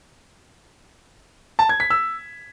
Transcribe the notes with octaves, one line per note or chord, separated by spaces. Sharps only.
A5
G#6
B6
E6